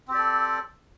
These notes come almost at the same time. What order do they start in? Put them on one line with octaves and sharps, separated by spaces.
C4 G4 D5 A4